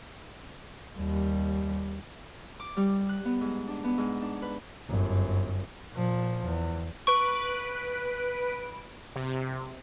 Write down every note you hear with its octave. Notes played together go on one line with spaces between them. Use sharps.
D#2 G3
D6
G3
F#6
B3
G#2
D4
B3
G#2
D4
B4
G1 F#2
A#2 F3
E2
B4 C#6 D7
C3